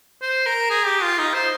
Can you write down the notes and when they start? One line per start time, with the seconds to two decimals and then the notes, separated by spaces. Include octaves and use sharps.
0.21 C5
0.46 A#4
0.70 G#4
0.86 G4
1.02 F4
1.18 D#4
1.34 C5